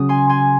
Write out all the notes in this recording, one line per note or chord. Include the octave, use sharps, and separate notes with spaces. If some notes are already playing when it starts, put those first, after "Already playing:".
Already playing: C#3 F#3 D#6
G#5 C6
G#5 C6